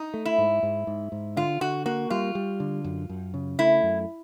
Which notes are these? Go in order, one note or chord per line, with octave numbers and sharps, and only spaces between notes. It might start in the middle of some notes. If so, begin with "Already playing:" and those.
Already playing: D#4
A3
E4
G#2
G#2
G#2
G#2
D3 F4
D3 F#4
A#3 F#4
G3 F4
G3
D3
F#2
F#2
C#3
A3 E4
F#2